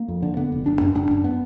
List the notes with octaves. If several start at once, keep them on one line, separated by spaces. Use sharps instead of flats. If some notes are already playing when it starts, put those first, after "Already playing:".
Already playing: A#3
F2
D3
D3 B3
F1
F#1 D4
F#2
F#1 D4
F#2
B3